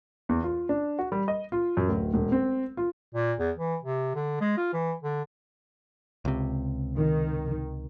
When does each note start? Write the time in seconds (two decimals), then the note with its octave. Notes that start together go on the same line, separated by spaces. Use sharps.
0.29 E2
0.44 F4
0.69 D4
0.99 F#4
1.12 G3
1.28 D#5
1.52 F4
1.77 F#2
1.89 D1
2.14 E1
2.32 C4
2.77 F4
3.14 A#2
3.39 E2
3.57 E3
3.83 C3
4.15 D3
4.40 G#3
4.57 F4
4.73 E3
5.03 D3
6.25 C#2 C3
6.96 D#3